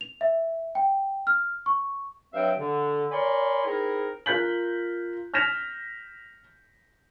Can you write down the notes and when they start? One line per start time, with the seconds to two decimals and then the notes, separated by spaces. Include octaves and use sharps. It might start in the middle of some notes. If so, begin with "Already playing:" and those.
0.01 F7
0.21 E5
0.75 G5
1.27 F6
1.66 C#6
2.34 G2 F#3 C4 E5 F5 G5
2.59 D3
3.11 A#4 C#5 D5 G#5 B5 C6
3.65 C4 D#4 E4 G#4 A#4
4.26 F4 A#4 F#6 G6 B6 F#7
5.34 F6 G6 A#6 B6 E7 F7